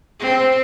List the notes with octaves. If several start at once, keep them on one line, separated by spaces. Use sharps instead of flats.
C4